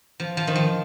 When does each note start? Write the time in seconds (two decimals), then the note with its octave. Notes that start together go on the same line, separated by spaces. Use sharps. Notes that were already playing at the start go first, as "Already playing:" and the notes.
0.20 F3
0.37 F3
0.47 D#3
0.55 F3